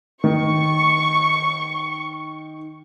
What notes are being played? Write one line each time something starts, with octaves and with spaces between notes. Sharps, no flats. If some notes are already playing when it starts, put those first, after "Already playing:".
D#3 C#6